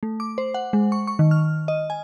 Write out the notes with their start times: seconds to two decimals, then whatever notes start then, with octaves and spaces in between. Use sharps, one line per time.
0.03 A3
0.20 D6
0.38 C5
0.54 F#5
0.73 G#3
0.92 C#6
1.07 C#6
1.19 D#3
1.31 F6
1.68 D#5
1.90 G#5